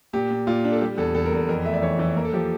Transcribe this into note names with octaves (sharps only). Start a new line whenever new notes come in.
A#2 G4
A#2
A#2 F4
D4
A4
G3 G4
E2 A4
E2 A4
A#4
E2 A4
F2 A#4
A3 E5
D5
E3 C#5
E3
A#3 A#4
A4
F3 G4